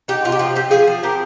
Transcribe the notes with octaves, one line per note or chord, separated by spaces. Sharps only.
D#4 G4
C3 F4
G4
F3 F4
C4 G4
F3 F4 G#4
F3
C4 G4 A#4